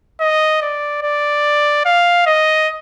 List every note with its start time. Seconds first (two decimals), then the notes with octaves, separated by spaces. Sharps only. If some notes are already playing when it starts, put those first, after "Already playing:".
0.20 D#5
0.62 D5
1.02 D5
1.85 F5
2.26 D#5